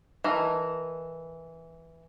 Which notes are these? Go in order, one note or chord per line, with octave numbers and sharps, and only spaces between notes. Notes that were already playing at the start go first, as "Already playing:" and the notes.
E3 A#4 D#5 A5